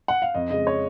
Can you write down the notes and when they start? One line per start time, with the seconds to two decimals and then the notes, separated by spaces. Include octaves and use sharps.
0.08 F#5
0.22 F5
0.34 F2 D#5
0.50 C#3 G#3 D#5
0.67 C#5